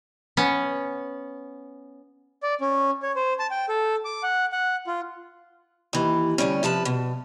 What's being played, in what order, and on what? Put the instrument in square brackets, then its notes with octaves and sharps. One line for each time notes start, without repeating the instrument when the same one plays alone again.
[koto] B3 C#4
[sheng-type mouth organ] D5
C#4
C#5
C5
A5
G5
A4
D6
F#5
F#5
F4
[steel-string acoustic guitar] D#2 E3
D2 G#2 G3 C#4
C3 F3 B4 A5
B2